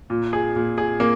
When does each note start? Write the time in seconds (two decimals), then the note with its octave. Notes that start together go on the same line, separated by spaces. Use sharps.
0.10 A#2
0.33 G#4
0.56 A#2
0.78 G#4
1.00 A#3